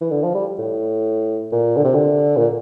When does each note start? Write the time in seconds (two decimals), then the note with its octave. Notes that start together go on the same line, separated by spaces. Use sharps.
0.01 E3
0.11 D3
0.24 F3
0.35 G3
0.59 A2
1.52 A#2
1.77 D3
1.85 C3
1.94 D3
2.37 A#2